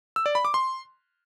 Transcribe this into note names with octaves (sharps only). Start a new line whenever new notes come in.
E6
D5
B5
D6
C6